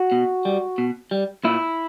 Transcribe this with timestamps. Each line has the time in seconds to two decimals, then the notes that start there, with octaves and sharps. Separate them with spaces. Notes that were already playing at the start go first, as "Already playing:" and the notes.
Already playing: F#4
0.12 B2
0.45 G3
0.78 B2
1.11 G3
1.44 A#2 E4